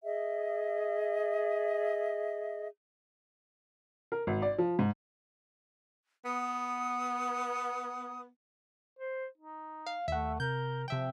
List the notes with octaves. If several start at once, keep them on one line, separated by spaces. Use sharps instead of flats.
G#4 D#5 E5
A#4
G#1
D5
F3
G#2
B3 D#6
C5
D#4
F5
D#2 A3 E5 F#5
C3 A#4 G6
C3 F3 E5 G5